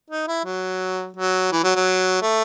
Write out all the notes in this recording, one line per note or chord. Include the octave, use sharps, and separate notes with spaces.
D#4
E4
F#3
F#3
E3
F#3
F#3
A3